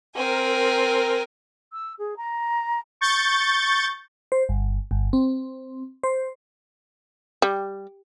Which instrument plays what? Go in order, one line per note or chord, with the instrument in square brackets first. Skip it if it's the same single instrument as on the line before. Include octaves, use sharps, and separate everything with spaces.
[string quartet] C4 G#5 [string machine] A#4
[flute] E6
G#4
A#5
[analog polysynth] C#6 G6 A6
[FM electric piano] C5
G1
G1
C4
C5
[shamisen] G3